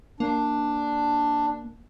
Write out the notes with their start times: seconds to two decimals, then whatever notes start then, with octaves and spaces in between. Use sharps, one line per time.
0.20 A#3 D4